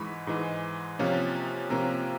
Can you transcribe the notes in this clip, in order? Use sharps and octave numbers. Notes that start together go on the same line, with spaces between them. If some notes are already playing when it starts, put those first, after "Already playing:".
Already playing: G#2 E3 G#3 B5 C#6
G#2 E3 G#3
C3 F3 A#3 C#4 F4
C3 F3 A#3 C#4 F4 A#5